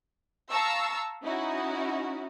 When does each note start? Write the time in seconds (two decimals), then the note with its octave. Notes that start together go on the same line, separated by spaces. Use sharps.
0.50 F5 A5 A#5 C#6 E6
1.24 C#4 D#4 E4 F#4